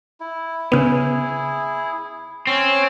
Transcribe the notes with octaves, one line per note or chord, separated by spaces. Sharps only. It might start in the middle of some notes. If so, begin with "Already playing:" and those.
E4
C#3 B3 E4 G#4
C4 C#4 C#5